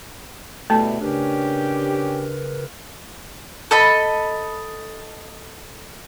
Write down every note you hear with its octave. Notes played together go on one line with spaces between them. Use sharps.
B2 G3 A3 E4 A4 A5
C#3 C#4 D4 G4 A#4 B4
A4 D#5 B5